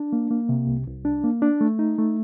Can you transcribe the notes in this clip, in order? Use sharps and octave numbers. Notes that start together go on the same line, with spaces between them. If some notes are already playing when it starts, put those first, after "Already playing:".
Already playing: D4
A#3
A#3
C3
C2
C2
D4
A#3
D4
A3
D#4
A3